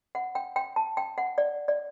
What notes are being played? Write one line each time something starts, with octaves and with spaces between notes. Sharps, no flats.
F#5
G5
G5
A5
G5
F#5
D5
D5